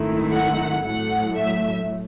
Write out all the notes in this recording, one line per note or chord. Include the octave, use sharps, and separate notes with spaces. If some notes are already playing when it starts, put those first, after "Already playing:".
Already playing: G#1 F#2 D#3 A3 E4
F#5
A2 F#3 A3 F#5
E5